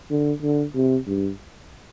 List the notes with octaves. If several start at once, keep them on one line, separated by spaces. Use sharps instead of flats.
D3
D3
C3
G2